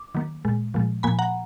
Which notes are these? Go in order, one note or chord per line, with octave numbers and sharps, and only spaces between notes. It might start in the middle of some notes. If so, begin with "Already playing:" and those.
Already playing: D6
D#3 F#3 A#3
A#2 G#3
A#2 F3 G#3
A#2 F3 A#3 G#5 B5
F#5 A#5